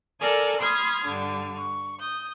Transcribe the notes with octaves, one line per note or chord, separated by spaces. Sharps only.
A4 A#4 D5 G#5 A5
B5 C6 D#6 F6 G#6
G2 D3
C#6
D#6 G6